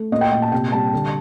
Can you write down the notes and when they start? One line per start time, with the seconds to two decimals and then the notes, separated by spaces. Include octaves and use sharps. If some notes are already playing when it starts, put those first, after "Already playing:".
Already playing: A3
0.12 A#2 D#5
0.21 G5
0.32 A#2 G5
0.42 A5
0.52 C3 G5
0.72 G3 A5
0.93 D3